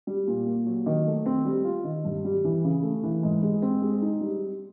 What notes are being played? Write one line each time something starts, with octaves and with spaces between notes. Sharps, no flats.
G3
A#2
A#3
F#3
D#3
A3
C4
G3
F4
D#3
G2
G3
E3
C#3
A3
E3
G#2
G#3
C4
G#3
D#4
G3